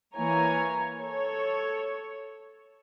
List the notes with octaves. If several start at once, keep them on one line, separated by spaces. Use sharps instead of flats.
E3 A#3 C#5 G#5 A#5
A4 C#5